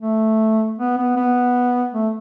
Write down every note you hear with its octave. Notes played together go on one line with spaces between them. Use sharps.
A3
B3
B3
B3
A3